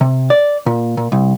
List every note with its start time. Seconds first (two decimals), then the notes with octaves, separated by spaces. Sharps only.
0.01 C3
0.30 D5
0.66 A#2
0.97 A#2
1.12 C2